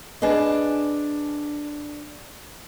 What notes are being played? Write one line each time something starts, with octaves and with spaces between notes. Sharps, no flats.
D4 G#4 B4 D#5